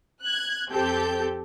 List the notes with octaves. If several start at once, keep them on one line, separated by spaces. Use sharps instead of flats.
F#6 G#6
F2 C4 G4 A4 G6